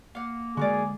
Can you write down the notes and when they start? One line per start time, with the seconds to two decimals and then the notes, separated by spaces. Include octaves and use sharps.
0.15 A#3 F5 F#5
0.57 D3 G#3 F#4 G#4 A#4 D5